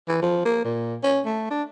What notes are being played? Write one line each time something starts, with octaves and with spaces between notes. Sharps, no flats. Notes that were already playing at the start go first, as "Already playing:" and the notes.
E3
F3
A#3
A#2
C#4
A3
D4